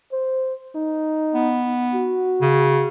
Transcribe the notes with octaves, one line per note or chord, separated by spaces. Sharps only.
C5
D#4
B3
F#4
C#3